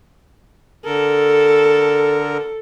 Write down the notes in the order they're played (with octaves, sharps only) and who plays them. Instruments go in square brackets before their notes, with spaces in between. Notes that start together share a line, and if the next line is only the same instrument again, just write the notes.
[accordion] D3 A#4 [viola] A4